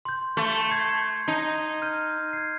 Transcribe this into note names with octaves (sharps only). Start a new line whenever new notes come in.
C6 G6
A3
G#6 C7
D#4
F6 G6 D#7
G#6 C7